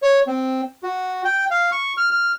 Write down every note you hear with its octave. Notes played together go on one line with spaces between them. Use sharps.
C#5
C4
F#4
G5
F5
C#6
F6
F6